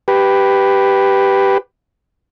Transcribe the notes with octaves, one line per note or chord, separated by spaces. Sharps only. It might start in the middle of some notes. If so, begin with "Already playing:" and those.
G4 B4